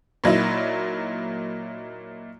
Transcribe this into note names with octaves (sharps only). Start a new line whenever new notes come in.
A#2 F#3 D#4 E4